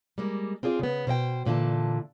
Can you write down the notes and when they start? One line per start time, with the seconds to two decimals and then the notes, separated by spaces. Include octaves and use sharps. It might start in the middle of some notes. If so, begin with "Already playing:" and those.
0.18 G3 G#3 A#3
0.63 C4 F4 G#4 D5
0.79 C#3 B3
1.07 B2 C5 D#5 G5
1.45 G2 A#2 D3 E3 A5